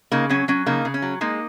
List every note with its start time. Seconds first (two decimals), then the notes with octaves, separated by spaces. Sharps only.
0.11 C#3 A#3 D#4
0.29 F#3 C#4
0.48 F#3 C#4
0.66 C#3 A#3 D#4
0.85 C#3
0.94 C#4
1.02 F#3
1.21 G#3 A#3 D#4